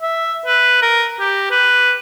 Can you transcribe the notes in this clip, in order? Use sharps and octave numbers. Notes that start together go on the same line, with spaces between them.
E5
B4
A#4
G4
B4